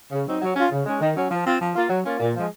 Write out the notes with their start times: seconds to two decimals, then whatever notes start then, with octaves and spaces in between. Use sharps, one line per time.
0.12 C#3
0.26 F#3 C4 D#4
0.42 F#3
0.56 C#4 F4
0.72 C#3
0.86 G#3 C#4
1.01 D#3
1.17 F#3 C#4
1.31 F3
1.46 C4 F4
1.61 F3
1.76 A#3 F4
1.90 F#3
2.06 A#3 C#4 F4
2.20 A#2
2.36 F3 G#3